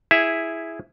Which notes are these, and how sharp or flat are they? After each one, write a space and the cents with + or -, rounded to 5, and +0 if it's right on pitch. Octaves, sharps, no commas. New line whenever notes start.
E4 +0 G#4 +0 E5 +0